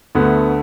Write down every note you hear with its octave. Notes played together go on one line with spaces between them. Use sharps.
D2 D3 A3 B3